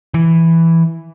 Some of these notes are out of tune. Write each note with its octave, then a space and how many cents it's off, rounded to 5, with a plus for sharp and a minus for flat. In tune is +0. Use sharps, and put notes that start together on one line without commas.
E3 +0